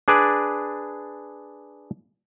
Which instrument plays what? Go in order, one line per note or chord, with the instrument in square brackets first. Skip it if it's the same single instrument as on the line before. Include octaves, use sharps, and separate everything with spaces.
[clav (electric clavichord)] D4 G#4 B4 D5